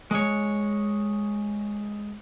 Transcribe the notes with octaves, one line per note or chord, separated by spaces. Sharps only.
G#3 C#5